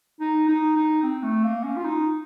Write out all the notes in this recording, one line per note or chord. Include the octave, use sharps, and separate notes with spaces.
D#4
D#4
D#4
C4
A3
A#3
C#4
F4
D#4